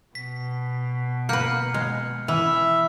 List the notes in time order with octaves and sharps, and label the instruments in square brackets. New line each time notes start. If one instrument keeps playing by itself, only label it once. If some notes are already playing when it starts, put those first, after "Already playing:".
[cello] B2 [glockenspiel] B6
[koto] A#3 B4 [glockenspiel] F6 G6 C#7
[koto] G#3
[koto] E3 [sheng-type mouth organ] E5 [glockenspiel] B5